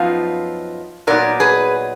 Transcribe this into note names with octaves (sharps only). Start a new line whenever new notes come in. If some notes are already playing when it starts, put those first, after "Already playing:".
Already playing: F#2 F3 B3 D#4 F4
A#2 F#3 B3 D#4 A#4 D5
G#4 B4